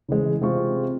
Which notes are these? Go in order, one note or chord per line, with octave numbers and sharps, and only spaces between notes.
C#3 E3 G#3
C3 G#3 C4 F4 C#6